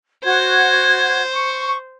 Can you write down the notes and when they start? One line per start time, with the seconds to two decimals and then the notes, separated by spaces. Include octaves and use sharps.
0.24 F#4 C5 G#6
1.34 C#6